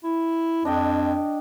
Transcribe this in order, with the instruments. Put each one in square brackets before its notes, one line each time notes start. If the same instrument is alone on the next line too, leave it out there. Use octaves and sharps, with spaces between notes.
[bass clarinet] E4
[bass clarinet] F2 [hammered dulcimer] D4 D#5 G5